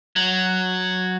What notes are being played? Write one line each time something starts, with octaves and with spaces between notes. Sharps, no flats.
F#3